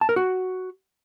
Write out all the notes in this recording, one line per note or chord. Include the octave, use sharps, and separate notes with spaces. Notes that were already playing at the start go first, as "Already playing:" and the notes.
A5
A#4
F#4